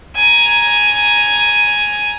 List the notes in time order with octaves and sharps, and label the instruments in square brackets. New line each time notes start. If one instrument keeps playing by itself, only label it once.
[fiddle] G#5 A#5